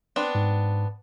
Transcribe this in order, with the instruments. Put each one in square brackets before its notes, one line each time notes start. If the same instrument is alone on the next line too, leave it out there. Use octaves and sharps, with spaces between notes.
[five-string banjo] B3 C4 D4
[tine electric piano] G#2